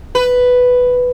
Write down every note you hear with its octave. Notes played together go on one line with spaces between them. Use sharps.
B4